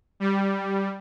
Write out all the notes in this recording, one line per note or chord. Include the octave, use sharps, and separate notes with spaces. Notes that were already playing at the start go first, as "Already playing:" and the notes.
G3